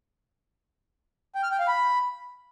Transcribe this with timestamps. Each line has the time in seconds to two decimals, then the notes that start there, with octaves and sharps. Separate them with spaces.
1.35 G5
1.43 F6
1.51 G5
1.59 F5
1.67 B5